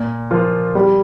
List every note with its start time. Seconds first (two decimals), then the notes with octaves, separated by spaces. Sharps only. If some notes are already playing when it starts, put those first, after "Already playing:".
Already playing: A#2
0.31 F3 A#3 F4
0.75 G3